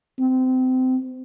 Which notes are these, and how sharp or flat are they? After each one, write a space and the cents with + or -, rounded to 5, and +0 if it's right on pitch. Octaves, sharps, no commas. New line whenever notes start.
C4 -25